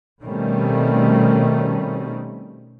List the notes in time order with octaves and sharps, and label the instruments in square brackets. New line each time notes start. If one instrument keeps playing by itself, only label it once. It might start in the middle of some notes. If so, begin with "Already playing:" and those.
[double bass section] B2 D#3 G3 A3 C4 C#4